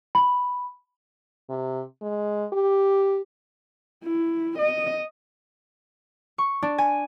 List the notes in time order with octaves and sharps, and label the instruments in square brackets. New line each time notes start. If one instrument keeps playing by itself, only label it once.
[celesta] B5
[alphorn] C3
G#3
G4
[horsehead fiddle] E4
D#5
[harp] C#6
D4
G#5